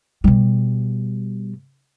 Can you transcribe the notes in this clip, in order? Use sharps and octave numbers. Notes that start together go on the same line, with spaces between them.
B2 G3